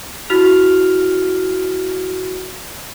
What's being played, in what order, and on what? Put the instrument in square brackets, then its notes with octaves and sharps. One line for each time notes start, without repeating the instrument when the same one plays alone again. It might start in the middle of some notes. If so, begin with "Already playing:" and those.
[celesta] E4 F#4 F6 F7